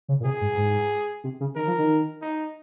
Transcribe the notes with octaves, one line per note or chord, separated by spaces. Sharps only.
C#3
A#2
C3 G#4
G#2
G#2
C3
C#3
D#3 A#4
F3
D#3
D#4